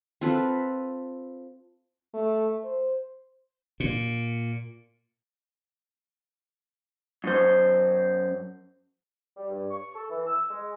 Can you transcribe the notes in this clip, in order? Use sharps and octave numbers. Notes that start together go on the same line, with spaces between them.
C4 F4 A4 B4
A3
C5
A#2
F#2 C5
G3
G2
C#6
A4
E3
E6
G#3